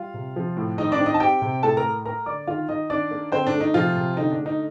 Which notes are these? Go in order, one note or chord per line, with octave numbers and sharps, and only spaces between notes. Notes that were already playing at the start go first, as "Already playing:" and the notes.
Already playing: G3 F4 F5
C3
F3
A2
D#3 D#4 D#5
D4 D5
C4
D#4 D#5
A5
C4 G4 G5
C3
A2 A4 A5
A#4 A#5
A3
A#3 A#4 A#5
D3 D5 D6
D#3 F4 F5
D#3 D#4 D#5
D#3 D4 D5
A#3
D3 C4 C5
D4
A3
D#4
C3 F3 F4
C3
D3 D#4
D4
A3
D#4